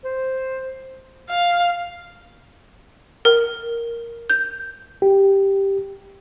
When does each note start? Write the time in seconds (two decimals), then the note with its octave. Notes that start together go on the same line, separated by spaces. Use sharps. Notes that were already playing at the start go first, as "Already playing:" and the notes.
0.04 C5
1.30 F5
3.25 A#4
4.30 G6
5.02 G4